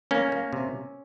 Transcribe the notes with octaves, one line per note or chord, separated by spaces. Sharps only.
A#3 C#4
A#3
C3